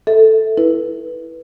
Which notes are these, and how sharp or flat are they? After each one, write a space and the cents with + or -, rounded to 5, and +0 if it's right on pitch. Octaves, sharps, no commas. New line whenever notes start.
A4 +0 E5 -20
E4 +0 B4 -15